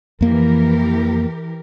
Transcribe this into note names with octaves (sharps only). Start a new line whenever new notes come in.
F2 E3 A#3 G4 A#4